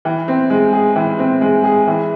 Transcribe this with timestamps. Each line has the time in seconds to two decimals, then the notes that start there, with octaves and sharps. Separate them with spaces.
0.05 E3
0.28 C4
0.50 G#3
0.73 G#4
0.96 E3
1.19 C4
1.41 G#3
1.64 G#4
1.87 E3